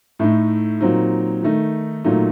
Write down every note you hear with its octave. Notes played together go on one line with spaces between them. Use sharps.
A2 A3 D#4
A#2 F#3 C4 D#4
D#3 A3 D#4
A#2 F#3 A3 D#4